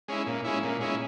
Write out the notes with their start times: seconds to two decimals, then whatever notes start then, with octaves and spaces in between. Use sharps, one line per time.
0.08 G#3 C#4 E4
0.26 A#2
0.44 G#3 C#4 E4
0.63 A#2
0.81 G#3 C#4 E4